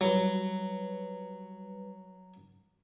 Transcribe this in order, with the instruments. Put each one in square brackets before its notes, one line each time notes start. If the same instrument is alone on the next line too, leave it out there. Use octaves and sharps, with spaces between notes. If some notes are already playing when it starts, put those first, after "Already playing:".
[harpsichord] F#3 [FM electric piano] G3 B4